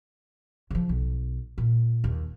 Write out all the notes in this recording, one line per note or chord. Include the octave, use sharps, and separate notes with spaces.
C#3 F3
B1
A#2
D#2